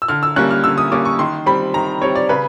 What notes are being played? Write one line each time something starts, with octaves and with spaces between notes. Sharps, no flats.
E6
D3 F6
E6
G3 A#3 C#4 F#6
F6
D3 E6
D#6
G3 A#3 C#4 D6
C#6
D#3 C6
G3 C4 B5
D#3 A#5
G3 C4 C#5
D5
C#3 B4